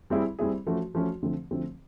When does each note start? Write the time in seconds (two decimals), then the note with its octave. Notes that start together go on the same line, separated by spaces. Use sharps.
0.10 G3 C4 E4 G#4
0.39 G3 C4 E4 G#4
0.67 F3 A3 C#4 F#4
0.95 F3 A3 C#4 F#4
1.23 D3 F3 A3 C4
1.51 D3 F3 A3 C4